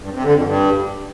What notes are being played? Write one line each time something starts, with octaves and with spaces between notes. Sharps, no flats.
G2
C3
D3
F2
G2